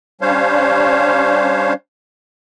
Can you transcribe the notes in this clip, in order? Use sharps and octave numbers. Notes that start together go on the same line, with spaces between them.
G3 C#4 D4 C5 C#5 F5